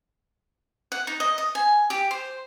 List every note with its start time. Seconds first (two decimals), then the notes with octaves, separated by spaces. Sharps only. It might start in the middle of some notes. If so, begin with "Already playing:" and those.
0.92 F#5
1.07 D#4
1.20 D#5
1.38 D#5
1.55 G#5
1.90 G4
2.11 C5